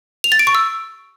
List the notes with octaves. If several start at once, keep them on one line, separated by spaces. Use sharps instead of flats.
F7
A6
D7
C#6
E6